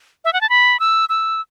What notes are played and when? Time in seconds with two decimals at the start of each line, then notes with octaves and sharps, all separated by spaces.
0.25 E5
0.33 F#5
0.41 A5
0.50 B5
0.80 E6
1.09 E6